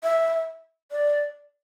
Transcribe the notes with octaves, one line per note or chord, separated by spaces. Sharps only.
E5
D5